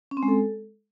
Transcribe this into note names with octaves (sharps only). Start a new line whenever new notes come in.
C#4
C4
G#3
A4